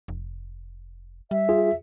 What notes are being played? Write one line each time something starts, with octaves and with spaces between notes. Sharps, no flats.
F1
G3 E5
F4 G#4